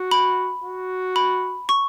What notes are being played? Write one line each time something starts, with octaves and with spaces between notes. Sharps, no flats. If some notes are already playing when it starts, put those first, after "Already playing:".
Already playing: F#4
B5
F#4
B5
C#6